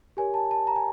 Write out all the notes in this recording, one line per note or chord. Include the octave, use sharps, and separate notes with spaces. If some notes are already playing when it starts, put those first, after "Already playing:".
G4 A#4 C#5 G#5
A5
A5
A#5
G#5